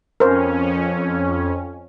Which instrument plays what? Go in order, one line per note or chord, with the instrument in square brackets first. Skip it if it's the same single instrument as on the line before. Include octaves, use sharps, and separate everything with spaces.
[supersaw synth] F2 C#4 [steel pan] A#4 C5